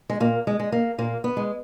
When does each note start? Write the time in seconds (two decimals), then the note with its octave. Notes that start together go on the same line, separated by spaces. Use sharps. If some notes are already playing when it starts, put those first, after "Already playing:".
0.10 G#3
0.20 A#2 A#3
0.47 G#3
0.60 G#3
0.72 A#3
0.98 A#2 A#3
1.24 B3
1.37 G#3